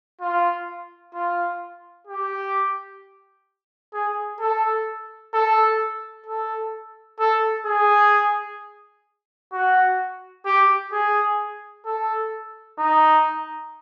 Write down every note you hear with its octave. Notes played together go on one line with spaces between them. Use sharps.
F4
F4
G4
G#4
A4
A4
A4
A4
G#4
F#4
G4
G#4
A4
D#4